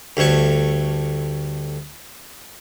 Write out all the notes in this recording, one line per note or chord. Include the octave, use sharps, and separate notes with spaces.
D2 G2 A3 C#5 C#6